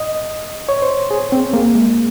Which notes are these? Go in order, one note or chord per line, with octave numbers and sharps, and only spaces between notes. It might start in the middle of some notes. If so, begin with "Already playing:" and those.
Already playing: D#5
C#5
C5
G#4
C4
A#3
G#3